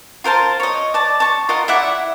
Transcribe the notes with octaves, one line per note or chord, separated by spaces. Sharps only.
F4 A#4 C5 A5
C#5 D#5
D5 A5
A5 C#6
F4 A#4 D#5 F#5
E4 D5 E5 F#5